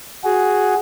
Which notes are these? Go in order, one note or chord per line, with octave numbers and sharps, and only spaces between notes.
F#4 G#4